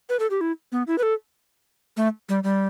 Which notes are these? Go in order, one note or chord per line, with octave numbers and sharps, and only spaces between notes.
B4
A4
G4
E4
B3
E4
B4
A4
A3
G3
G3